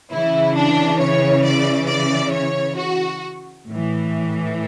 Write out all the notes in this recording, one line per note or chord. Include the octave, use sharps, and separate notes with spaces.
C#3 E3 E4
D4
C#5
D5
D5
C#5
F#4
A2 E3